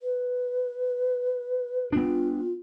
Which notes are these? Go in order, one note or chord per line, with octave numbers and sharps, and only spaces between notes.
B4
B3 D4 F4